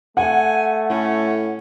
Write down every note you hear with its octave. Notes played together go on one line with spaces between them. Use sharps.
A3 F#5 G#5
A2 C#4